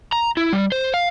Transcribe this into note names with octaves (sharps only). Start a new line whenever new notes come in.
A#5
E4
G3
C5
F5